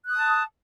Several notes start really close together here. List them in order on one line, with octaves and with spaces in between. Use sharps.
F#6 D#6 A5